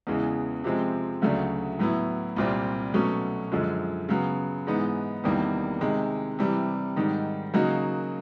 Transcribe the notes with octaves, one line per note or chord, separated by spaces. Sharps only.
E2 C#3 E3 G#3
C3 F3 G#3 C4
D2 C#3 F#3 A3 D4
A2 F#3 B3 E4
C2 A#2 G3 C4
B2 F#3 A3 C#4
F#2 D3 F3 G#3
C#3 F#3 B3
G#2 E3 G#3 B3 D#4
E2 C3 D#3 G3 A#3
C3 D#3 G#3
C3 E3 G3
G#2 D#3 G3
C#3 F#3 A#3 D#4 F#4